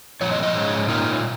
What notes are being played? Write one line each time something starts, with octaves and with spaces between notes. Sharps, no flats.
A#2 F3 C#5
D#5
D#5
G#2 G#3 C#4
A#2 A#3 D#4 F4